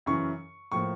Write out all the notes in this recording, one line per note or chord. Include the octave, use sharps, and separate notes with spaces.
F#2 C#3 E3 C#6
A2 F3 A#3 C#6